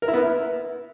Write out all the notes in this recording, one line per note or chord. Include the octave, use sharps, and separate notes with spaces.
A#4
E4
B3
E4